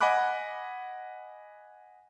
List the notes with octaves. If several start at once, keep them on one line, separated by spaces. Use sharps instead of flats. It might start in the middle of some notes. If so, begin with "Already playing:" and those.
D#5 F#5 G#5 B5 D6 F#6